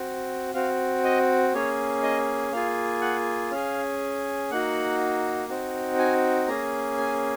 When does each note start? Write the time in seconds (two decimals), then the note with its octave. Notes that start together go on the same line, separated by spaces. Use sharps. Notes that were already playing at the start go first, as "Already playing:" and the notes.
Already playing: C4 F#4
0.54 C4 F#4 F5
1.04 D#5
1.54 A#3 C#4 G#4 C#5
2.03 D#5
2.52 A#3 F4 G#4 F5
3.01 F#5
3.51 C#4 G#4 F5
4.51 A#3 D#4 F#4 F#5
5.49 C4 D#4 F#4
5.99 G#5
6.48 A#3 C#4 G#4 A#5
6.98 G#5